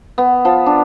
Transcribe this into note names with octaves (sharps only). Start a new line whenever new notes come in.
B3
F3
D4